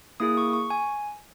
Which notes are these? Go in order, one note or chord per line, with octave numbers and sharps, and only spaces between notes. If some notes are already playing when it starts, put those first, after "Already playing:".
A#3 E4 G#4 D#6
C#6
C#6
G#5